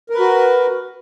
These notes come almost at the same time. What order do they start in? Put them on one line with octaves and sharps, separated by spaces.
A#4 B4 F#4